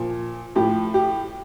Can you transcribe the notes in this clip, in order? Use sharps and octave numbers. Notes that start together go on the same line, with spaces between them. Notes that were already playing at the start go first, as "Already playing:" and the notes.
Already playing: A#2 F3
A2 F3 G4
G4